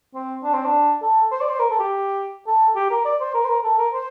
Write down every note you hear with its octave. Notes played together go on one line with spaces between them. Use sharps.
C4
D4
C4
D4
A4
C5
D5
C5
A#4
A4
G4
A4
G4
A#4
D5
C5
A#4
C5
A#4
A4
A#4
C5